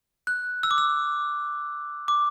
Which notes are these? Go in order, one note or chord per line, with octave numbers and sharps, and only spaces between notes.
F#6
E6
D6
E6
D6